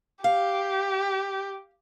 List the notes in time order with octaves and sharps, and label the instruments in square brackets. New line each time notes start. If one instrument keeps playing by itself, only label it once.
[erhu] G4 [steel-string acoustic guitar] F5